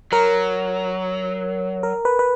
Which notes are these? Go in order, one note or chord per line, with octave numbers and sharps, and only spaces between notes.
F#3 A#4
A#4
B4
B4